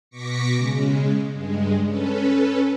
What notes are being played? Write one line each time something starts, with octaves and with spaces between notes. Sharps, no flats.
B2 C#6 D6 A#6 B6 C#7
C#3 G#3
G2 G#3
C#4 A4 B4